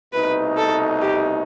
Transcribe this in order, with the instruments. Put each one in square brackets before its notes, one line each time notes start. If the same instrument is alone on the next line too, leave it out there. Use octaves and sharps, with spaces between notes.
[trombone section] C2 B2 A3 D#4 [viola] B4
[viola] A4
G4